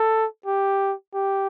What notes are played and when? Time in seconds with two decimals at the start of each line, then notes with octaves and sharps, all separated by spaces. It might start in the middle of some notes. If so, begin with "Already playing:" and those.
Already playing: A4
0.46 G4
1.14 G4